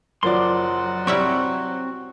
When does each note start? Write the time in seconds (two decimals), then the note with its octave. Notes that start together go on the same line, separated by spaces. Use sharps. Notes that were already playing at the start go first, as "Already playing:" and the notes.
0.23 F#1 F3 F#3 D5 C6 D6
1.07 C3 G3 C4 E4 C#6